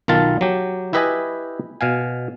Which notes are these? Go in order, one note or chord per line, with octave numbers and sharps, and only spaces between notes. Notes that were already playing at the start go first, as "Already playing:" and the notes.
B1 D#3 F4 A5
F#3 G4
E4 G4 B4 D#5 E5 G#5
B2 F5 G#5